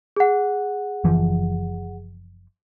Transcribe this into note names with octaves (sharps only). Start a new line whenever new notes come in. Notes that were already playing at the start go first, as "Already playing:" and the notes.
G#4 F#5
F#1 E3 F3